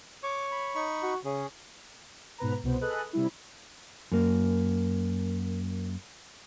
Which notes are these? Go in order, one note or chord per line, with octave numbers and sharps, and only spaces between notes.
C#5 D6
B5
D#4 B5 C#6
F#4
C#3 C#4 G#4
G#2 B2 B4 A#5
C2 B2 C5
G#4 A4 B4 D#5 F#6
C3 G3 E4
F#2 A#3